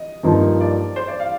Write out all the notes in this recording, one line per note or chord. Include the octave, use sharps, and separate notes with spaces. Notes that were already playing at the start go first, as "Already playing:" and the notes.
Already playing: D#5
G2 F3 A#3 D#4
D5
C5
D5
F5